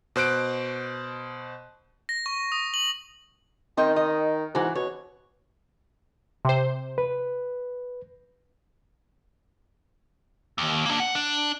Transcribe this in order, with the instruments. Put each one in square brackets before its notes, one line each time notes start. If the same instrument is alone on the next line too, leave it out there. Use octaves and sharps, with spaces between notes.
[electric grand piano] B2 C5 F#6 D7
[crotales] A#6
C#6
D#6
F#7
[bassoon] D#3 [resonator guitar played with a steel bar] C4 D#5 G5
[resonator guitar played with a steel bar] D#5
[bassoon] G#2 [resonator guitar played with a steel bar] E3 F#4
[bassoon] B2 [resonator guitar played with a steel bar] C#5
[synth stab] C3 C5
[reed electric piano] B4
[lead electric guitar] D#2
A#3 D4
F#5
D4